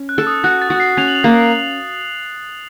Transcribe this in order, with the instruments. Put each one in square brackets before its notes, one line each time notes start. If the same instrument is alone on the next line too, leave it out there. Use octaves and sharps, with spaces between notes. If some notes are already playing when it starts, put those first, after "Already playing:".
Already playing: [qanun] C#4
[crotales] F#6
[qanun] A4
[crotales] D#6
[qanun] F#4 [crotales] F#6
[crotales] A6
[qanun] F#4
[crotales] C7
[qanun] C#4 [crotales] F7
[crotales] F#7
F7
[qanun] A#3